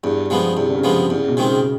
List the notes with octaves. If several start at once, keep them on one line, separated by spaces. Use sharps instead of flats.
E2 G2
C3 F3 G#3 B3
E2 C3
D3
C#3
C3 F3 G#3 B3
E2 C#3
B2
C3 D#3 G#3 C4
C#3